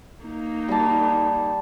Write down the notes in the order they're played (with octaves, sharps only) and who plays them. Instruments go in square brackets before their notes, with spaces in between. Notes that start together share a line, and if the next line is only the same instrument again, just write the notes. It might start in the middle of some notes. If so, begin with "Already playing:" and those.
[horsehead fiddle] A#3 D#4
[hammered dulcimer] G3 A5